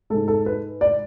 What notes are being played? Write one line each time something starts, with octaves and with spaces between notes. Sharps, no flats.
G#2 G#3 A4
A4
B4
D5